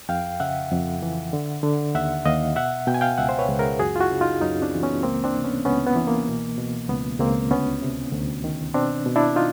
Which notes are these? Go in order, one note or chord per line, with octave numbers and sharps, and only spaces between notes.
F2 F5 G5
C#3 E5 F#5
F2
E3
D3
D3
D#2 E5 F#5
D#2 D#5 F5
B2 E5 F#5
B2 G5
G#5
F5 G5
C#2 E5 F#5
C5
B4 C#5
C#2
G#4 A#4
F#2 F#4 G#4
F4
E4 F#4
C#3
D#4 F4
F#2 C#4 D#4
C4 D4
E3
B3 C#4
C#2 A#3 C4
C4 D4
C3
B3 C#4
C#2 B3 C#4
B3
E3
A#3
B2
B2
C#2 B3
C#2 A#3 C4
D2 B3 C#4
C3
D2
D#3
B2 C4 D4
B2
D4 E4
D#4 F4